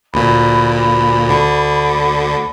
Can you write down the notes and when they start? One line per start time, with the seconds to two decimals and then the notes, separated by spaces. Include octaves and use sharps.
0.14 D2 A#2 B5
0.71 B5
1.28 D2 D3